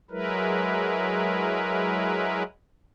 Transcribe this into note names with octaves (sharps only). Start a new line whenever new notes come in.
F#3 G#3 E4 A#4 B4